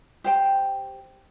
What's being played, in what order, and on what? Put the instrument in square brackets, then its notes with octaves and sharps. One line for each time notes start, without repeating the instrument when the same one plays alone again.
[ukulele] G4 C5 G5